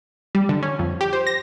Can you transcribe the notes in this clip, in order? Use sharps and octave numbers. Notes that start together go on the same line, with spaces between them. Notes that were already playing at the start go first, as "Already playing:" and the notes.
G3
D3
C#4
F2
G4
C5
A#6